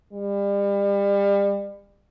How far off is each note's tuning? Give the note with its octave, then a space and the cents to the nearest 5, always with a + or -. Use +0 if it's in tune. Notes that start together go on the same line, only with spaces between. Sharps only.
G3 +35